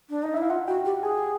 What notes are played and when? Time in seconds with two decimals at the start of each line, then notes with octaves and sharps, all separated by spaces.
0.10 D4
0.23 D#4 D#5
0.34 E5
0.37 E4 F5
0.50 F4 F#5
0.68 F#4 G5
0.85 G4
1.03 G#4 G#5